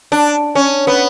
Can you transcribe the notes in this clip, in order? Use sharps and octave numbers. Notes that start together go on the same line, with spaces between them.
D4
C#4
B3